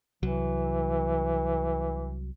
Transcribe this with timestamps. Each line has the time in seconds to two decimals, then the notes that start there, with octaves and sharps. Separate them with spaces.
0.23 C2 E3 F#3